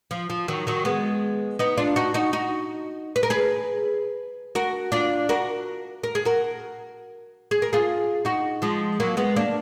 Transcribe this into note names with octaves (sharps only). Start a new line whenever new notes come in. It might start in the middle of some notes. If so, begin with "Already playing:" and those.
F3
F3
D#3 F#3
D#3 F#3
G#3 B3
B3 D#4
D4 F4
D#4 F#4
D#4 F#4
D#4 F#4
B4
A#4
G#4 B4
F#4 A#4
D4 F4
F#4 A#4
A#4
G#4
F#4 A#4
G#4
A#4
F4 G#4
D#4 F#4
F3 G#3
F#3 A#3
G#3 B3
A#3 D4